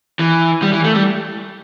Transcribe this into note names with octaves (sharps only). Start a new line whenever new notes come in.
E3
G3
E3
A3
G3